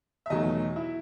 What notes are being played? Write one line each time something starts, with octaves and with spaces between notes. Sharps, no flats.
E5
E2 B2 F#3 A3 D#4 D#5
E4 E5